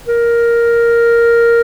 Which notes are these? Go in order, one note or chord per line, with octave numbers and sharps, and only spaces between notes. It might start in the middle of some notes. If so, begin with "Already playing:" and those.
A#4